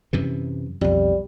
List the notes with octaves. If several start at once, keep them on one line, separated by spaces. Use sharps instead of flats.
F#2 C3 E3
B1 F2 G3